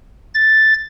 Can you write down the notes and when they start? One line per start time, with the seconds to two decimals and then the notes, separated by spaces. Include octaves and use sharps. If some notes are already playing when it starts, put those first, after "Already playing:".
0.34 A6